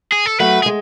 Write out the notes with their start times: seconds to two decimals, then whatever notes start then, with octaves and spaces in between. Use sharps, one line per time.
0.12 G#4
0.26 A4
0.40 F#3 A3 B4
0.63 G#4
0.66 G#3